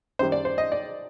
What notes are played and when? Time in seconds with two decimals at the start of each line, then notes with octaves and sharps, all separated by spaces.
0.19 F#2 D#3 G3 C5
0.32 D5
0.45 C5
0.58 D#5
0.72 D5